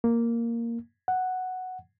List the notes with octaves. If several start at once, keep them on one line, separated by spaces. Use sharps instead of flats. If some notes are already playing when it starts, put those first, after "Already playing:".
A#3
F#5